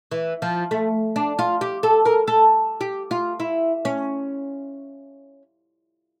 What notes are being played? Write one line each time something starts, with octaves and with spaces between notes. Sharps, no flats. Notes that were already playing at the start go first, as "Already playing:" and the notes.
E3
F3
A3
D4
F4
G4
A4
A#4
A4
G4
F4
E4
C#4